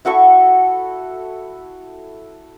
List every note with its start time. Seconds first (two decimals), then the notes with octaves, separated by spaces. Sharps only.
0.05 E4 F#4 A4 C#6